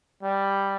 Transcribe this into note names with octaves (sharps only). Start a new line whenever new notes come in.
G3